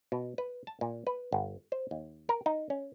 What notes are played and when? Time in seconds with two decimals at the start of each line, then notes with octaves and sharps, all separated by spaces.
0.12 B2
0.38 B4
0.67 A5
0.81 A#2
1.07 B4
1.32 G1
1.72 C5
1.91 D#2
2.29 A#4
2.46 D#4
2.70 C#4